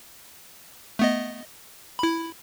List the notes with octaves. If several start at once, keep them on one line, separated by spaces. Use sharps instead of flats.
A3 B3 D#5
E4 B5